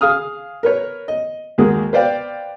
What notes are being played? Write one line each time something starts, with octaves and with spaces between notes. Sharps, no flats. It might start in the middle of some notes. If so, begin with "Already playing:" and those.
G#4 F5 D#6 F6
A#4 B4 C#5
D#5
D#2 G#3 A#3 F#4 G#4
B4 C5 D5 F5 G5